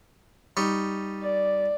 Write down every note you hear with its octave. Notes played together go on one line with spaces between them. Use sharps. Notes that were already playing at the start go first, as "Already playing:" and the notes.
G3 D#4 C#6
D5